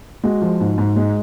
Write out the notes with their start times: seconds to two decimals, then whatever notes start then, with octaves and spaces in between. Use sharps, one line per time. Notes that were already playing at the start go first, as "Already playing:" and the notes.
0.24 G#3 F#4
0.42 F3
0.60 G#2
0.78 G#2
0.96 G#3